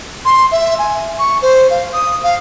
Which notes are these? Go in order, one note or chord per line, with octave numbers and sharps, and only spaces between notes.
C6
E5
G#5
C#6
C5
F5
D#6
F5